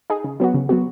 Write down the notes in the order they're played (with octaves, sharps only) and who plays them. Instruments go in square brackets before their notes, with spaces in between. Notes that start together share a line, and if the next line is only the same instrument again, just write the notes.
[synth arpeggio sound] D#4 G#4
C#3
F#3 B3 F#4
C#3
F#3 B3 F#4